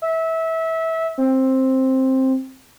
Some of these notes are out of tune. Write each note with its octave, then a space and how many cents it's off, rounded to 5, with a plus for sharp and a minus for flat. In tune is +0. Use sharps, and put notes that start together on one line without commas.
E5 -20
C4 +10